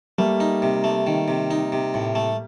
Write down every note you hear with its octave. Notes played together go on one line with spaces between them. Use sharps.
G3 A3 A#3
D#4
C3
A3
D#3
C3
D#4
C3
A2
A3